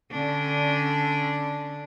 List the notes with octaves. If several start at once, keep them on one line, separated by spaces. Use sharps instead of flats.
D3 C#4 D4